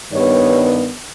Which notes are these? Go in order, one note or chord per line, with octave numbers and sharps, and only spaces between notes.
G2 D#3 G3 B3 C#5